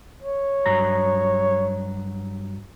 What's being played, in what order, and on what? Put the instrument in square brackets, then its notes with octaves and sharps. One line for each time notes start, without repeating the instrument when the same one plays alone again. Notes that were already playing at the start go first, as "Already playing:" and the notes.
[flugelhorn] C#5
[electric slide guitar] G2 F#3 A#5